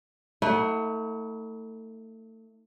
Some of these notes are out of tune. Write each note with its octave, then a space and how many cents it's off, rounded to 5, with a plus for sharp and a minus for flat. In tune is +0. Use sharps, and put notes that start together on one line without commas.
A3 +30 E4 -45 F#5 +15